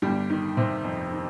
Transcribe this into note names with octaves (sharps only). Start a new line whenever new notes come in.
G1 G3 G4
D#3 D#4
C3 C4
F2
D#3